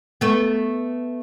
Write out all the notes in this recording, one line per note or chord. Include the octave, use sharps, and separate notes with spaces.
A3 B3